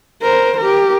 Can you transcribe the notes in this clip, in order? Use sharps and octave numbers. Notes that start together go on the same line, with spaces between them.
A#4 C5
G4 A#4